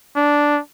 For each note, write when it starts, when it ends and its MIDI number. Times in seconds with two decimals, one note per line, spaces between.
0.16 0.60 62